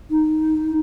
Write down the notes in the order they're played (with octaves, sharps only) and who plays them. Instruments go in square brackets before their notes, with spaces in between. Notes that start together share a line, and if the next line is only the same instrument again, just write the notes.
[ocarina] D#4